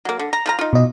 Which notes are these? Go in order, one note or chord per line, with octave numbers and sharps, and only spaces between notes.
F#3 A#3
D3
A#5
F3 F4 A#5
D#4 F4
B2 D#5